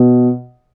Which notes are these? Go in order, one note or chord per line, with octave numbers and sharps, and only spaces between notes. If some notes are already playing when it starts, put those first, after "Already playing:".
Already playing: B2